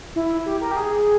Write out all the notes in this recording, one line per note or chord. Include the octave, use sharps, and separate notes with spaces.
E4
G4
A#4
G4
G#4